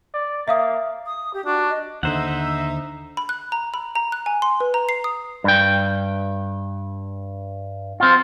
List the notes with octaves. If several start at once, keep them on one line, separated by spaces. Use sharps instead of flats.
D5
A#3 E5 F5 D#6
D#6
G4
D4 F#4
D#5
D#2 D3 D#4 C5 E5 F#5
B5
F#6
A#5
B5
A#5
F#6
G#5
C6
B4
A#5
C7
D#6
G2 G5
C4 F4